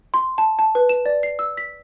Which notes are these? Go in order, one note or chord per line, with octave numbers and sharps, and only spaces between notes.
C6
A5
A5
B4
E7
D5
C7
E6
B6